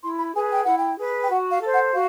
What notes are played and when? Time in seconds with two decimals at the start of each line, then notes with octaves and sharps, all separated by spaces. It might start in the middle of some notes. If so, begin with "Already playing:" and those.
0.02 E4 C6
0.17 B5
0.34 G#4 B4 G#5
0.50 G5
0.64 E4 F#5
0.77 G5
0.98 G#4 B4
1.21 G5
1.29 F#4 F#5
1.50 F5
1.62 A4 C5
1.72 F#5
1.93 F#4 F5